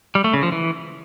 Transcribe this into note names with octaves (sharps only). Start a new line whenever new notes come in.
G3
A3
C#3
F3
E3